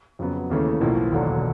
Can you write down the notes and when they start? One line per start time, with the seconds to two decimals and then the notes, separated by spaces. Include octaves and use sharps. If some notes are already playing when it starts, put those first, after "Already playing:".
0.19 F2 C#3 F#3 B3
0.50 D#2 C#3 E3 A3
0.80 B1 A2 F3 A#3
1.12 E1 D#2 D3 F#3